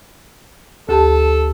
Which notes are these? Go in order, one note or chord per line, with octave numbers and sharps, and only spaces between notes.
D2 G4 A4 A5